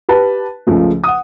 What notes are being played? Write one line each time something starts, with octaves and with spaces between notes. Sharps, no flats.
G4 B4 A5
C#2 C#3 F3 A3
F#5 D#6